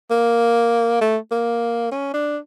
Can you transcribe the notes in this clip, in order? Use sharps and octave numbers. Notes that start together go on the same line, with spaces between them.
A#3
A3
A#3
C#4
D4